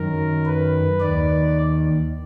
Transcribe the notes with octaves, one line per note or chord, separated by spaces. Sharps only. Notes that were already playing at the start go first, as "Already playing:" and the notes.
Already playing: F#2 D#3 A#4
B4
D#2 D#3 D5